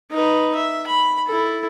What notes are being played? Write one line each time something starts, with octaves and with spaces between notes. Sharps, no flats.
D#4 B4
E5
B5
E4 A4